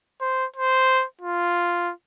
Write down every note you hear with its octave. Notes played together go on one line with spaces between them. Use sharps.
C5
C5
F4